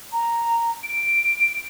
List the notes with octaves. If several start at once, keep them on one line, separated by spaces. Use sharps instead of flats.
A#5
D7